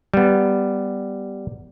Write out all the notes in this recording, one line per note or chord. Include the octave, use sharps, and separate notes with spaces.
G3 B3